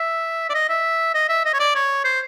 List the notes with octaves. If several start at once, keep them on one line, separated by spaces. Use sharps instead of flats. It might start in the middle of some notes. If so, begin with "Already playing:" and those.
Already playing: E5
D5
D#5
E5
D#5
E5
D#5
C#5
D5
C#5
C5